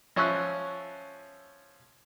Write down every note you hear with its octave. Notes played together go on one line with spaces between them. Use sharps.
F3 C#4 E5 C#6 E6 F#6